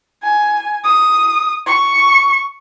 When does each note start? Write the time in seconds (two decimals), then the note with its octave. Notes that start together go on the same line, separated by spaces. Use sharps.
0.23 G#5
0.85 D#6
1.67 C#6